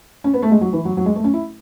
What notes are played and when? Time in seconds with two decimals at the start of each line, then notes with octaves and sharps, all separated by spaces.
0.24 C#4
0.33 B3
0.42 A3
0.51 G#3
0.61 F#3
0.73 E3
0.85 F#3
0.97 F#3
1.06 G#3
1.15 A3
1.24 C#4
1.33 E4